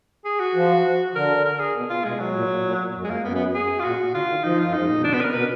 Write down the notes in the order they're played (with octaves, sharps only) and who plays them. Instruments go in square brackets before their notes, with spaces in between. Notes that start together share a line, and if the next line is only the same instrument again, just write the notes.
[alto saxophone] G#4
F#4
[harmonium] F3
[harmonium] D3 [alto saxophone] A#4
[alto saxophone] A#4
G#4
[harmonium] B2
[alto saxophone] F4
[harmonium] B2 [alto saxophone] G#3
[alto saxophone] F#3
[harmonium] A#2
A#2
F#2
[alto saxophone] G#3
A#3
[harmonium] F#2 [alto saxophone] B3
[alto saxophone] B3
G#4
F4
[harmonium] A#2 [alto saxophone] F#4
[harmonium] D3 [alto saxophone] F4
[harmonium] D#3
[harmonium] F3 [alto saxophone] D#4
[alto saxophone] F4
[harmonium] F#2
[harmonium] G#2 [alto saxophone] D#4
[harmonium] A#2
B2
[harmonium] D3 [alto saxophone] D4
[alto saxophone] B3
[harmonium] B2 [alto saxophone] B4
[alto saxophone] A#4
[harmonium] B2 [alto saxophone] B4